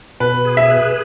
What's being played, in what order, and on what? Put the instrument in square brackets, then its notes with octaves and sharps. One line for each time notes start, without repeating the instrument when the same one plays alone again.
[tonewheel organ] B2 [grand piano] B4
[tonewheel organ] G#4
[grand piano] E5
[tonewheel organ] B4